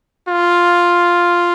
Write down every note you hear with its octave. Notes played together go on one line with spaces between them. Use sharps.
F4